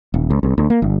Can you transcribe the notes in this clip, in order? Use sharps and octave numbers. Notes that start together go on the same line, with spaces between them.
D#1
C#2
C2
D2
A#3
G1